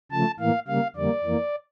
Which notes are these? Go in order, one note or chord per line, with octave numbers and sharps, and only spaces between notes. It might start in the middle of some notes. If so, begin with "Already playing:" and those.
C#3 F3 A3 A5
A2 E3 A#3 F5
C#3 G3 A#3 F5
F2 D3 G3 A#3 D5
F2 E3 A#3